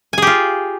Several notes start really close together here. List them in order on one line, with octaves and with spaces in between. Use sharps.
G#5 G#4 G4 F4